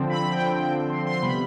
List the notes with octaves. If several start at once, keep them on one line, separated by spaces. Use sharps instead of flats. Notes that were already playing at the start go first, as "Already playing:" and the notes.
Already playing: D3 F3 C4
B5
G5
G5
C6
C6
C3 G3 B3 B5